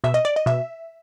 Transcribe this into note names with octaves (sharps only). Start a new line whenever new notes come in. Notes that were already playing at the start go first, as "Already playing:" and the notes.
B2 E5
D#5
D5
D#5
B2 E5